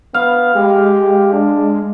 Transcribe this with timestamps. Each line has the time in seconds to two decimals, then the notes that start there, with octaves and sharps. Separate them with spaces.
0.14 B3 F5
0.55 G#3 G4
1.33 D4